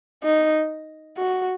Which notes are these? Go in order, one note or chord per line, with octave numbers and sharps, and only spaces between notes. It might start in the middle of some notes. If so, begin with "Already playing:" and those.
D#4
F#4